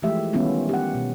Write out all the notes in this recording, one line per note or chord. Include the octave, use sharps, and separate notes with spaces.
E3 F3 G#3 A3 G4 E5
D#3 G3 B3 C#4 E4 F4
G4 F#5
B2